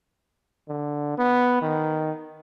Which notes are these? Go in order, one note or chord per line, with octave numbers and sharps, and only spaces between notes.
D3
B3
D#3